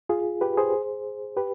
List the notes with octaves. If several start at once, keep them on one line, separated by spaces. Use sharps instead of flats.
F4 G#4
G4 B4
G#4 C5
G4 B4